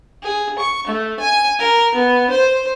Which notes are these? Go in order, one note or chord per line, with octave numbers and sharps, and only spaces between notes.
G#4
C#6
A3
G#5
A#4
B3
C5